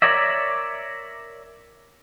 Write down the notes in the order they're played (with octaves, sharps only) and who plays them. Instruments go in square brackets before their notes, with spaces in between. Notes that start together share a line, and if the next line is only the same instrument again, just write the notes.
[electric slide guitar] A#4 C#5 D5 E5